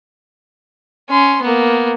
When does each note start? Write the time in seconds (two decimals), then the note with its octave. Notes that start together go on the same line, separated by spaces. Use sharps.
1.10 C#4 C6
1.43 A#3 B3